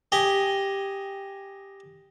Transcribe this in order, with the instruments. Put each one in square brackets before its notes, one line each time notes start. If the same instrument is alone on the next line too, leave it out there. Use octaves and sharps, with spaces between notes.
[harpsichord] G4 D#5 G#5